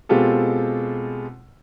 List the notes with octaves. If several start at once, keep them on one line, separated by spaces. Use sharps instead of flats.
B2 G#3 C4 F4 G4 A4